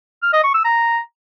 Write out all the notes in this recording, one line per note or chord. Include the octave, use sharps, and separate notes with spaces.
F6
D#5
C#6
E6
A#5